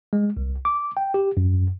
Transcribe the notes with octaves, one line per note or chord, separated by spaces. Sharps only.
G#3
C2
D6
G5
G4
F#2